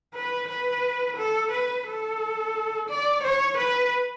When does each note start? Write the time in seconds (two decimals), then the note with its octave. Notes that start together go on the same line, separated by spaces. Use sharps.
0.14 B4
0.48 B4
1.17 A4
1.51 B4
1.87 A4
2.89 D5
3.23 C#5
3.58 B4